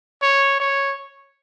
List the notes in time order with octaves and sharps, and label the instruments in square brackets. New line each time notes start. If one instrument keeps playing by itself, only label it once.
[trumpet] C#5
C#5